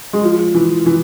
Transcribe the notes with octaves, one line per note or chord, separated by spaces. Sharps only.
G#3
F3
E3
E3